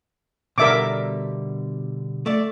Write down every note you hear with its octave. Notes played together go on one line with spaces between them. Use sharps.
B2 D3 G3 A#4 E5 D6
A3 D5